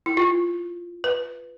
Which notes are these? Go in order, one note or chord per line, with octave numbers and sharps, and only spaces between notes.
E4
F4
B4